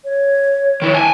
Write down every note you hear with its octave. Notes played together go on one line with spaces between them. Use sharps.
C#5
D#3 E4
G#5 A5